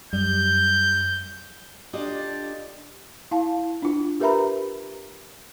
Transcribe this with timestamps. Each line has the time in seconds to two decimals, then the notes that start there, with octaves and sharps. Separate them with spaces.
0.13 F#2 G3 G6
1.93 D4 F4 G4 A4 D5 D#5
3.31 E4 F5 A5
3.82 D4 F4
4.20 G4 A#4 B4 E5 A#5 B5